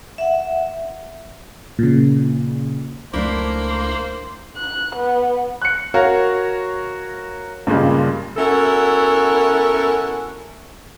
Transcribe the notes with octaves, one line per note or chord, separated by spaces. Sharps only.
E5 F#5
A#2 C#3
C#2 A3 A#3 D4 E4 C5
F#6
B3
F#6 C#7
F#4 A#4 C#5 F5
G2 A#2 C#3 G3 G#3
B3 C#4 E4 F#4 A4 A#4